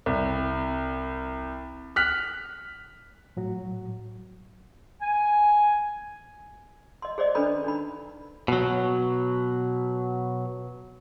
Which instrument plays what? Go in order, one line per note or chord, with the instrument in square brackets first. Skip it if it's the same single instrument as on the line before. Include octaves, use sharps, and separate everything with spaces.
[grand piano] C2
F6 F#6 B6
[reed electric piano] A2 F#3 F#4
[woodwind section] G#5
[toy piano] D#5 C6
G#4 C5 D5 D#5
C#4 D4 A4 B4 B5
D4 D#4 B5
[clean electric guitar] B2 F#3